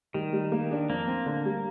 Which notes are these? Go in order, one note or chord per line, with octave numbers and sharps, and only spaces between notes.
D#3 G3
G3
A#3
D4
F2 A#3
C4
D3
G3